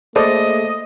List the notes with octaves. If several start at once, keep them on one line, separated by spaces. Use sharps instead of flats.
A3 A#3 G#4 A4 C5 D5 D#5